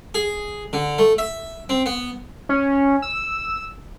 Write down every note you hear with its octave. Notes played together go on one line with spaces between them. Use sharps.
G#4
D3
A3
E5
C4
B3
C#4
E6